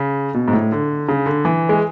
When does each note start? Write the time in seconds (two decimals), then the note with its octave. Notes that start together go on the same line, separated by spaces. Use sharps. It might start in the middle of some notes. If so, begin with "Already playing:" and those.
Already playing: C#3
0.34 B2
0.48 G#2
0.53 A2
0.72 D3
1.08 C#3
1.26 D3
1.45 E3
1.69 G#3